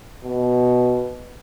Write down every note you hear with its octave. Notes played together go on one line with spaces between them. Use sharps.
B2